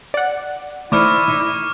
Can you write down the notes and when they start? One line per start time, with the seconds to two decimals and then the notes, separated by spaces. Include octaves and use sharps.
0.14 D5 F#5
0.92 A3 D#4 E4 C5 D5 C#6 D6 F6
1.28 D#4